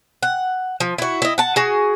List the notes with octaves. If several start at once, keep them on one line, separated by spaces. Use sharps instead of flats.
F#5
F3
E4 F#4
E4 D#5
F#5 A5
F#4 G#4